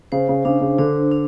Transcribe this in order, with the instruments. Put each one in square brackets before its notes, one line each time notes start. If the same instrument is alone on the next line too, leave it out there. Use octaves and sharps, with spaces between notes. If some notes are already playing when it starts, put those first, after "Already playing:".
[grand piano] C#3 [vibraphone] C5
[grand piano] C#3
[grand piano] C#3 [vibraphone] D4
[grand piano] C#3
[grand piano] D3 [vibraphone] D4
[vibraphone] D4